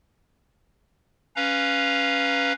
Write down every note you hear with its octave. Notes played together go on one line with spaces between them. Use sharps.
C#4 B4 F5 A#5